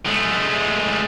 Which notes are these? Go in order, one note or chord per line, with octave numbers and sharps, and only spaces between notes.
G#3 A3